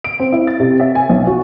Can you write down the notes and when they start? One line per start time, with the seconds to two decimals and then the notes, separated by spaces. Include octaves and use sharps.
0.04 D7
0.20 C4
0.32 E4
0.47 A6
0.60 C3
0.80 E5
0.95 G#5
1.09 B1
1.27 F#4